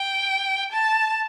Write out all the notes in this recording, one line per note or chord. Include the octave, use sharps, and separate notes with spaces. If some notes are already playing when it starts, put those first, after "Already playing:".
Already playing: G5
A5